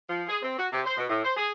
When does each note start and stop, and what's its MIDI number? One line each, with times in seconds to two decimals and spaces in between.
0.10 0.23 53
0.28 0.37 68
0.43 0.59 60
0.59 0.67 66
0.72 0.82 48
0.85 0.93 72
0.97 1.04 47
1.09 1.23 45
1.24 1.32 72
1.37 1.51 68